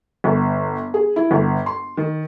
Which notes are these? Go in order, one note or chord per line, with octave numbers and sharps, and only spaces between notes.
G1
G#4
E4
G1
C6
D#3